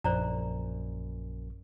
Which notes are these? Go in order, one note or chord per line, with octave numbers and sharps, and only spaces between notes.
A#1 F#2 C5 D5 A#5